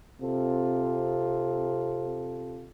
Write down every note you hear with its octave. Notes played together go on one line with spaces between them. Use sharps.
C3 C4 F4 A4